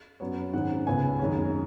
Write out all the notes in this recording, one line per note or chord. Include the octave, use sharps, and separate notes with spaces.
F#2 F#3 B3 C#5
G#2 D#3 G#3 C#4 F#5
C#2 C#3 B3 G#5
F#2 D#3 G#3 C#4